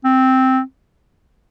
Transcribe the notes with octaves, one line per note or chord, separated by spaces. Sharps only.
C4